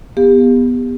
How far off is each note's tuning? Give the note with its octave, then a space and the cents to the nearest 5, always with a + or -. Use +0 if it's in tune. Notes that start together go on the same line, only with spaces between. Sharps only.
B3 +0 G4 +30 F5 +0